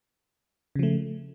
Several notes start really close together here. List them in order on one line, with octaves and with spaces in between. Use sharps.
C#3 F3 A3